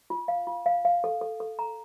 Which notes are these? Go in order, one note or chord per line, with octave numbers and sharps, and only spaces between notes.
F4
F5
F4
F5
F5
A4
A4
A4
A#5